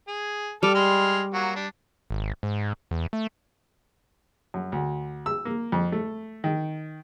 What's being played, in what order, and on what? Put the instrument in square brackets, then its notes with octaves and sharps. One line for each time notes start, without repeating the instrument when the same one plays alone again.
[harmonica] G#4
[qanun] G3 [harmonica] A4 D6 F6
[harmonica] G#3 C6 F6
F#3 A#3 F#4
G3 D4
[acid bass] G#1
G#2
E2
A3
[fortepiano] F#2
D2
E6
A#3
F2
A3
D#3